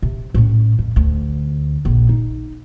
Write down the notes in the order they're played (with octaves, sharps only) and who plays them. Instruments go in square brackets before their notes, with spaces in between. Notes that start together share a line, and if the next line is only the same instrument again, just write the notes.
[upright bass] C3
A2 C#4
F2
D2
A#1 C3
D#4